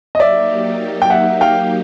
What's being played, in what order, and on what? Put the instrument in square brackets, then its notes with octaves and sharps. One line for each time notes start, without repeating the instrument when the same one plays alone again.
[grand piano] D#5
[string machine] F#3 A#3 D#4 G4 [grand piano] D5 E5
[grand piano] G5
E5 F#5
F5 G5